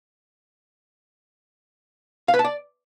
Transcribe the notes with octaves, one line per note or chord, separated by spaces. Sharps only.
F5
B4
A5
D5